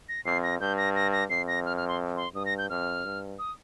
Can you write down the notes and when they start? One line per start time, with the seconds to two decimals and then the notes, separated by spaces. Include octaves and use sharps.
0.09 A#6
0.25 F2 C7
0.43 A#6
0.60 G2 G6
0.77 A#6
0.95 A#6
1.12 A#6
1.30 F2 C7
1.48 A#6
1.65 F6
1.77 F6
1.88 C6
2.17 C6
2.34 G2 D#6
2.46 A#6
2.58 G6
2.70 F2 F6
3.04 G2
3.39 D#6